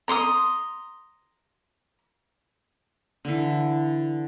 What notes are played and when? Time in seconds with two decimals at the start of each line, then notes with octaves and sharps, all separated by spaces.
0.08 A#5 C6 D6 D#6
3.25 D3 E3